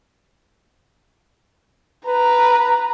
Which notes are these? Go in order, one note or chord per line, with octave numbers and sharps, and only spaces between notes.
B4 A#5